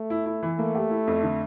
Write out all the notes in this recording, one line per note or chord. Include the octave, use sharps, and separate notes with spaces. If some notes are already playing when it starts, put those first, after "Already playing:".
Already playing: A3
E4
E4
E3
A3 A#3
G4
E4
F2
D3